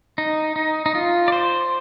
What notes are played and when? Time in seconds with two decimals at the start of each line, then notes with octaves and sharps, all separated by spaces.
0.18 D#4
0.56 D#4
0.86 D#4
0.95 F4
1.28 D5
1.32 C5